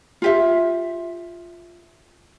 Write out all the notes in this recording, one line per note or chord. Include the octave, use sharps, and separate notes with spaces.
F4 G4 E5